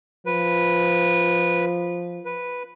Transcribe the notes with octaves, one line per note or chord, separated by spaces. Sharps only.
F3 B4
B4